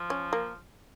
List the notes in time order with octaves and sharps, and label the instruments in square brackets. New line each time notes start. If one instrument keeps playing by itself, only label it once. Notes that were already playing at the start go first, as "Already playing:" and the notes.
Already playing: [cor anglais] F3
[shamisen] C#4
A#3